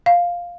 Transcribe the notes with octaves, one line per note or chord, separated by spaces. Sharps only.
F5